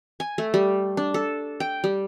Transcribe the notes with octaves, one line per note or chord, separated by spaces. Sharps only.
G#5
A3
G3
D4
A4
G5
G3